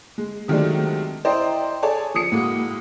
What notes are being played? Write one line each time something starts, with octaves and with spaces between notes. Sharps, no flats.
G#3
C3 D#3 F#3 G#3 A3 D4
E4 C5 D5 D#5 G5 A#5
G#4 A4 C#5 D5 G#5 A5
F3 D#6 C#7
A2 G#3 A#3 F#4